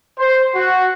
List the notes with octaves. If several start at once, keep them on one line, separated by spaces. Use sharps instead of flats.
C5
F#4